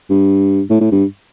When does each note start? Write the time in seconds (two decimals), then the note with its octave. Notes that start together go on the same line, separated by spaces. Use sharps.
0.10 G2
0.70 A2
0.81 A2
0.92 G2